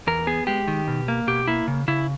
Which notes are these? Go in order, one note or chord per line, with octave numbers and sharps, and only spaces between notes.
E2 A#4
B3 G#4
G#3 G4
D#3
B2
A#3
B2 G4
A#3 E4
C#3
C#3 E4